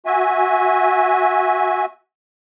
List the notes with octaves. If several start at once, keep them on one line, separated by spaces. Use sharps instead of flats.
F#4 E5 G#5